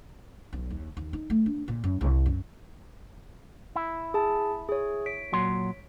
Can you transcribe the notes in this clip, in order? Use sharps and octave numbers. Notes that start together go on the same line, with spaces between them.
B1
D#2
D#2
D#4
A3
D4
A#2
F#2
C2
F#2
E4
G#4 A5
G#4 C#5
C#5 B6 D7
A#2 F#3 C6